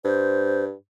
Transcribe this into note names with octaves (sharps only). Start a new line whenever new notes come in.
G2 C5